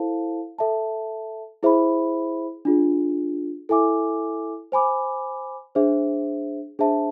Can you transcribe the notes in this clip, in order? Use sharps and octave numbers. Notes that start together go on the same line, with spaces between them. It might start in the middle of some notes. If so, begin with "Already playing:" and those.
Already playing: E4 A4 C5 F5 A5
A4 E5 A5
E4 G#4 C5 E5 B5
D4 F4 G#4
E4 A4 E5 G#5 D6
C5 G#5 B5 D6
D4 G#4 C5 E5
D4 G#4 C5 E5 A5